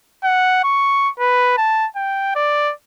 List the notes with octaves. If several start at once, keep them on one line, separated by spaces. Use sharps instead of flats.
F#5
C#6
B4
A5
G5
D5